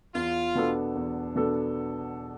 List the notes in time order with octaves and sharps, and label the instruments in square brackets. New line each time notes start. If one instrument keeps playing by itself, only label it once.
[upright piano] E2 [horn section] F4
[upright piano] B2 B3 D4 A4
E2
B2 B3 D4 A4